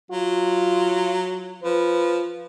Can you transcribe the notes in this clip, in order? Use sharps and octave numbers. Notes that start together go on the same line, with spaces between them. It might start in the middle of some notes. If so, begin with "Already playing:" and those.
F#3 F4
F3 B4